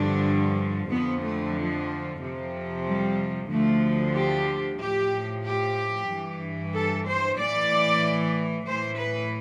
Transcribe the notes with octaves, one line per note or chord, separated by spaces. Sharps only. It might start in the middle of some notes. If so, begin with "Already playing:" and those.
Already playing: G2 D3 F3 D4
F2 D3 F3 B3
A3
F3
F2 C3 F3
G3
D2 D3 F3 A3
G4
A2 F3 G4
G4
G2 E3
A4
C5
A2 E3 D5
A2 E3 C5
B4